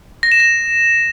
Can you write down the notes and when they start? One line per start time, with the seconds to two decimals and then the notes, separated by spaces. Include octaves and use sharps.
0.23 A#6
0.32 E7
0.40 A#6